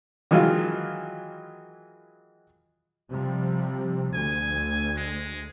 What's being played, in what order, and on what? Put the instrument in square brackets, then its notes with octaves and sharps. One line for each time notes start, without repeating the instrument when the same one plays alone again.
[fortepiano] D#3 E3 F#3 G#3 F4
[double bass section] C3 F3 G3
[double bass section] D2 [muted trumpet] G#5
[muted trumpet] G#3